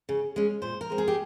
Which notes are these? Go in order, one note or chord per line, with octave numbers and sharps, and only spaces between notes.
C#3
G#3 C#4
A#2 C5
A#4
G#3 C4
G#4
G4